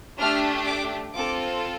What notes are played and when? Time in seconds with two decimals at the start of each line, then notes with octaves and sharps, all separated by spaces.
0.19 A3 D4 G4 F6
0.66 D6
1.14 C4 F4 A4 D6